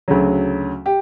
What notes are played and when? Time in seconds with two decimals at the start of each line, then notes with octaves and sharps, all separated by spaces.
0.08 D2 C#3 F#3
0.86 G4